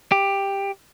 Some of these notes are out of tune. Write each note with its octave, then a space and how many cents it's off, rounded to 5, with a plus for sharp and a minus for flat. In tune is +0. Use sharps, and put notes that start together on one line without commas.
G4 +10